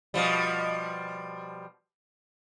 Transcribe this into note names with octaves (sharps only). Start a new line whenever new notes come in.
B2 F3 G3